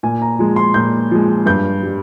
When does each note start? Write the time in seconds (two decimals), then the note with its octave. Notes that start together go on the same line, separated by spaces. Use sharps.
0.03 A#2 G#5
0.22 A#5
0.39 F3 G#3
0.56 C6
0.74 A#2 G6
1.11 F3 G#3
1.46 G2 G6
1.83 G3